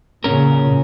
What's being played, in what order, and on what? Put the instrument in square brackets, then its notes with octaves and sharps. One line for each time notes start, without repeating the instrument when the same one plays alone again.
[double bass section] A#2 C#3 [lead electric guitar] C#4 A#4